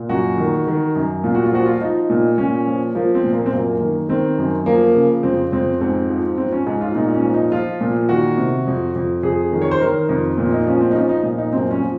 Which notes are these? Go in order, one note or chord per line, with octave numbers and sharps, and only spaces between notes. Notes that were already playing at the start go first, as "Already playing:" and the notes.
Already playing: A#2
F#2 F#4
D#3
D#3
F#2
A#2 F4
F#4
F4
F3 F#4
F4
F3 D#4
A#2
A#2 C#4
F3
F3 A#3
C4
A#2
A#3
C4
F#2 A#3
D#3
D#3 C4
F#2
F3 A#3
C#3
F2 C4
F2 C4
G#2 C4
F3
F3 C4
C#4
G#2 D#4
F4
A#2 D#4
C#4
F3
D#4
F3 F4
A#2
D#3 F#4
C3
F2
F2
F2 G#4
D#3
C#5
C5
D#3 A#4
F2
A#2 C4
D#4
F3 C#4
C4
D#4
F3 C#4
D#4
A#2
D#4
F#2 C4
C#4
F3